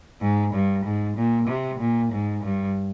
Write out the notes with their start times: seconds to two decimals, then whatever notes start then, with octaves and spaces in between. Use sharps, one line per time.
0.21 G#2
0.53 G2
0.84 G#2
1.17 A#2
1.48 C3
1.79 A#2
2.12 G#2
2.43 G2